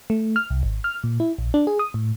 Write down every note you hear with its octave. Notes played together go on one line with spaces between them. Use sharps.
A3
F6
C2
G#1
F6
A#2
E4
A#1
D4
G#4
D#6
A2